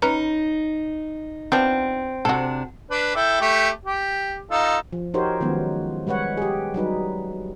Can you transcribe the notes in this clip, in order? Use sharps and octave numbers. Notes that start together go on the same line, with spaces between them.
C#4 D#4 B4 A#5
F3 B3 C4 D4
C3 D4 F#4 A4
D4 B4
E4 A4 G5
A3 G4
G4
D#4 F4 A4
F3
D#4 F#4 G4 A#4 C5 C#5
D#3 F3 F#3 G#3 B3 C#4
G3 G#3 B4 C#5 F#5
G4 G#4
F#3 G3 D#4 B4